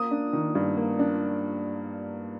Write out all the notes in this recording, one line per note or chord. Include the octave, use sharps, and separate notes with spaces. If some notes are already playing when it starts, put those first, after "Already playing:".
Already playing: A#3 D#6
D4
D#3
G2
A#3
D4